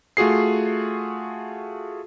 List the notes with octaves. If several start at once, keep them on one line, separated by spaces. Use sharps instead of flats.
A3 F4 F#4 G#4 C7